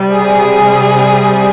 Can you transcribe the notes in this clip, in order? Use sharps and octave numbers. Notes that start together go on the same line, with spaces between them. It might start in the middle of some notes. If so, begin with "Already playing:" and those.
Already playing: C3 G3
G#4